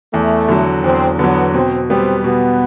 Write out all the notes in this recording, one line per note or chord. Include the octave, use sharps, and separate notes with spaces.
E2 A3
D3 F#3
E2 C4
D3 F#3 B3
B2 C4
G3 B3 C4
B2 B3